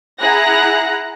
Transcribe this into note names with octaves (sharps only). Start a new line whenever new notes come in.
E4 G#4 F#5 A#5 F#6 A#6